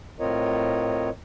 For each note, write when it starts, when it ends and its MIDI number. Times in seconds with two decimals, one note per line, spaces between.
0.20 1.10 45
0.20 1.10 60
0.20 1.10 65
0.20 1.10 70
0.20 1.10 73
0.20 1.10 75